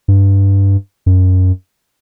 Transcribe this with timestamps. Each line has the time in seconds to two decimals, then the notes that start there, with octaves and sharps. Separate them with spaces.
0.08 G2
1.06 F#2